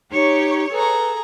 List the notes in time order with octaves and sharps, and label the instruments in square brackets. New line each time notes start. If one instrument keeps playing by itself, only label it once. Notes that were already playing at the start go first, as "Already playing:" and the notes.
[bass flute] D#4 [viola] G4 [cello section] C#5
[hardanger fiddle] G#4 A#5 [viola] A4 [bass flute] B4